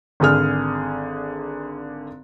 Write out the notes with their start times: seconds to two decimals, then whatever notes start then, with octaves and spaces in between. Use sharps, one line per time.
0.20 G#1 D3 G#4 F6